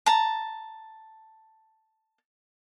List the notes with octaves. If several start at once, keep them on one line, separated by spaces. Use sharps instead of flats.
A5 A#5